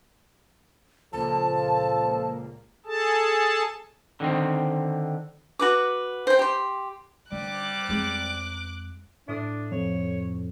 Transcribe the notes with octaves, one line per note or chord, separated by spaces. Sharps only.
C#2 A#2 F3 A#3 A4 A5
G#4 A4 A5
D3 D#3 C4
F#4 B4 D6
C5 G5
G4 C6
D3 G3 D6 F#6
F2 G#3
A2 D4 D#6 C7
F2 C#5